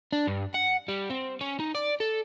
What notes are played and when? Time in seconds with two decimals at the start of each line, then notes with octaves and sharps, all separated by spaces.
0.13 D4
0.27 G2
0.54 F#5
0.88 G3
1.10 C4
1.41 C#4
1.60 D#4
1.75 D5
2.00 A4